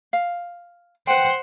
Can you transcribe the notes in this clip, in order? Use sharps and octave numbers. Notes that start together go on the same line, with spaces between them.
F5
B4 C5 F#5 G5